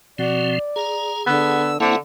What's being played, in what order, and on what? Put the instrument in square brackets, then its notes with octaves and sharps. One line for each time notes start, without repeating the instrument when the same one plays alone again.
[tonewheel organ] B2 F3 C4 [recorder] F#4 [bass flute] D5
[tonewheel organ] G#4 [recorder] A#5
[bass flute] D3 [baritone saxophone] B3 [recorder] E6
[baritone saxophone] D3 [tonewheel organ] A#3 E4 F#5 [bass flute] C4 [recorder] E5